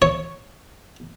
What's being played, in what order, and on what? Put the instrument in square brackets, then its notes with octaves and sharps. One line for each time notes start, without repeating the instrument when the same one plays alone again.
[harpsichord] C#5